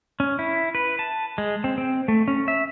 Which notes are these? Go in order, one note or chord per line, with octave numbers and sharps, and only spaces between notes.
C#4
E4
B4
A5
G#3
C4
C4
A3
C#4
E5